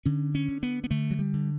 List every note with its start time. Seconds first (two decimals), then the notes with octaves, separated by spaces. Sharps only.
0.05 D3 C#4
0.35 C#4
0.48 D3
0.63 B3
0.84 B3
0.90 D3 A3
1.11 F#3
1.19 G3
1.33 D3